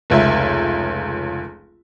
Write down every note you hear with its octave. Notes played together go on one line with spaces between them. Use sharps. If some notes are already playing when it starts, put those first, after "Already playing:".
F1 C#2 E5